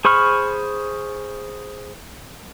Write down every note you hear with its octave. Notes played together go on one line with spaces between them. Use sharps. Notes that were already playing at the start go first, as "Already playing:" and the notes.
G#4 C5 B5 C#6 F6